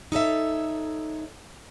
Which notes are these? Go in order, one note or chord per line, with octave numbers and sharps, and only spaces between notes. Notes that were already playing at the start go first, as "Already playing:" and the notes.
D#4 A4 C#5 E5